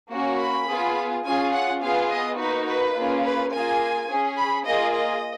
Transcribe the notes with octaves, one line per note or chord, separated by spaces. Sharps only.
A#3 C#4 F#4
B5
B3 F4 G#4
C#4 F4 G#4 G#5
F#5
B3 F4 G#4 F5
D#5
A#3 D#4 F#4 B4
B4
A#3 C#4 F4 G#4
B4
A#3 F4 G#4 G#5
C#4 G#4
B5
A#3 F4 G#4 D#5
D#5